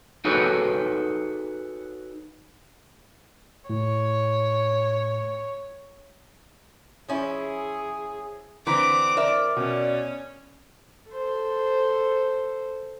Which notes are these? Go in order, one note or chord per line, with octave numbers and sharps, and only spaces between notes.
D#4 F#4 G#4 A4 B4 C#5
A2 C#5
F3 C#4 E4 G#4
D3 E3 C4 A#5 D6 B6
A#4 D5 E5
B2 C#4
A4 C5